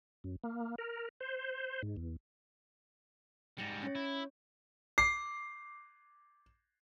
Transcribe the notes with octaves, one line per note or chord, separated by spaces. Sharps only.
F#2
A#3
A#4
C5
G#2
E2
G#2 G3 A6 A#6 C#7
C#4 C#5
E4
D6 C7